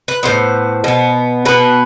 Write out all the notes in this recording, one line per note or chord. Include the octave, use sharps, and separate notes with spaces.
B4
A2 F3 B3 C5
B2 B3
B2 B3 B4